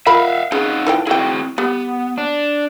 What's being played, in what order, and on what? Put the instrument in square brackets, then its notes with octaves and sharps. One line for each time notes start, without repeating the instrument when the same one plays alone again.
[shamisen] F4 A#4 B5 [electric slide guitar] E5 F5
[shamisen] C#3 [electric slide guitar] D#4 F5 F#5
[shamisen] E3 F3 G5
[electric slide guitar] C4 F#4 G#4 [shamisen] E4 G5
[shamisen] G3 [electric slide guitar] B3
[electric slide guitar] D4